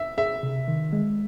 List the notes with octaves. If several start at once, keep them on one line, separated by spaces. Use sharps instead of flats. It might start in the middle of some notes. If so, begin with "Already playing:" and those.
Already playing: E5
G#4 E5
C3
D#3
G#3